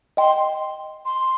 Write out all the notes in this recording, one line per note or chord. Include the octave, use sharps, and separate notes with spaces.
D#5 G5 C6
C6